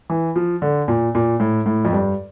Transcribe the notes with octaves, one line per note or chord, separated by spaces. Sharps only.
E3
F3
D3
A#2
A#2
A2
A2
F2
G2